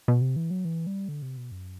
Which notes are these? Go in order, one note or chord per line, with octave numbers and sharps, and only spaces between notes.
B2
C3
E3
F#3
E3
G3
D3
C3
B2
F#2